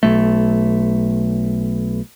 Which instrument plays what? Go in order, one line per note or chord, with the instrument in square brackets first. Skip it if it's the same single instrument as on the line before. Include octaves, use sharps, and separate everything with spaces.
[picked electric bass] B1 A3